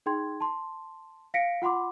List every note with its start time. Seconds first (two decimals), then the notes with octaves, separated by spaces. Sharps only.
0.06 D#4 G#4 G5 C6 G#6
0.40 A5 C6
1.34 F5 A#6 B6 C#7 D7
1.62 F4 F#5 B5 C6 D6